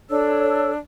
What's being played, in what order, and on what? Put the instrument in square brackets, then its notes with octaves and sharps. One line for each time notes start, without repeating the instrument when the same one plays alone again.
[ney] D4 [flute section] A4 C#5 E6